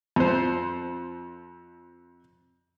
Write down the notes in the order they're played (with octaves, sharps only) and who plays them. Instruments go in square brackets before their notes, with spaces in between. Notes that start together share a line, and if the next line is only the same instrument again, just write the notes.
[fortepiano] F2 C5